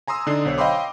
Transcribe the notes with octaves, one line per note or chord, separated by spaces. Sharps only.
G#5 A#5 C6 D#6 E6
D3 D4 D#4 D#6 C7
B1 C5 C#5
D#5 F5 G5 B5 C6 D6